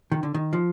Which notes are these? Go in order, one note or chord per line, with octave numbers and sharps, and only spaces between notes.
D#3
D3
D#3
F3